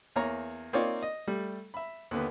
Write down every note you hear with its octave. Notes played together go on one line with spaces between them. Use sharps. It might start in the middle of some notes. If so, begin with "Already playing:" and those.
E2 A#3 C#5 A#5
A#3 C4 D#4 F4 C#5 D5
D#5
G3 A3
E5 B5
D#2 D3 B3